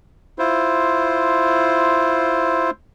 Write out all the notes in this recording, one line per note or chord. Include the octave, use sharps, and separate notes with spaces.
E4 F4 C5